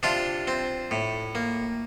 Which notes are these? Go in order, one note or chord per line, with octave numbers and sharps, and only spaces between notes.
C3 D4 F4
C4
A2
A#3